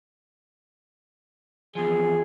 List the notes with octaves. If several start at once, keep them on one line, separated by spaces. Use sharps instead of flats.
E2 F3 G#4